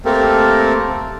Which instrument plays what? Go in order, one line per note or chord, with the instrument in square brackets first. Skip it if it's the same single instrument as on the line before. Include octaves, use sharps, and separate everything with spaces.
[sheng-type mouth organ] A3 A#3 C4 G4 A4 A#4